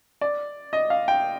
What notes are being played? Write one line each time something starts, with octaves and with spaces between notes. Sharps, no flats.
D5
D#5
F5
G5